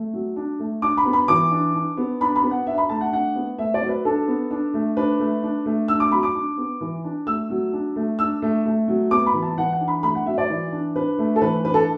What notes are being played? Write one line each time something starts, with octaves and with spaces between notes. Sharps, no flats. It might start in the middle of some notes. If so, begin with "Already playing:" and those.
Already playing: A3
F#3
D4
A3
D4 D6
B5
B3
B5
E3 D6
D4
D4
B3
D4 B5
B5
B3
F#5
D4 E5
B5
A3 A5
F#5
D4 F#5
B3
A3 E5
D5
F#3
B4
D4 A4
B3
D4
A3
D4 B4
A3
D4
A3
D4 E6
D6
F#3 B5
D6
D4
B3
E3
D4
A3 E6
F#3
D4
A3
D4 E6
A3
A3
F#3
B3 D6
B5
E3
A5
E3 F#5
F#5
D4
B5
A3 B5
F#5
F#3 E5
D5
E3
D4
D4 B4
A3
A4
E3 B4
D4 B4
A4